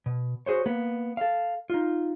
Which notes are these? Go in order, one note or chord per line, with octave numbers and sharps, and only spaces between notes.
B2
F#4 G#4 C5 C#5
A#3 B3
A4 F5
D#4 F4